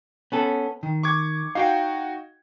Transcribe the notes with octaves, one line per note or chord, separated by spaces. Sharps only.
B3 C#4 A4
D#3
C#6 D6 G#6
D#4 F#4 F5 G5